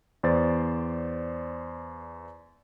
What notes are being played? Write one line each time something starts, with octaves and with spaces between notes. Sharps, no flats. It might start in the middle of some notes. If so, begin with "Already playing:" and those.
E2 C5 D5 A6